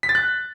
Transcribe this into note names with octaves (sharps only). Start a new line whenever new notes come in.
B6
A6
F#6